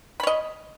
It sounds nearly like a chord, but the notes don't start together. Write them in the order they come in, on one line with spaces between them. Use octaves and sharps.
B5 C#5 D#5